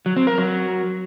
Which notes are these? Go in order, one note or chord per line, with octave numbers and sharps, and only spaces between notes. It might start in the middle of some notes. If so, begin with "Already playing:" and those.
F#3
C4
A#4
F#3